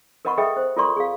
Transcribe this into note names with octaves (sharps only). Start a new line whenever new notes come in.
A#4 B4 D#5 F#5 B5 C#6
G#4 A4 B4 D#5 E5 G5
C5
F4 A4 A#4 D5 C6 C#6
G#4 F5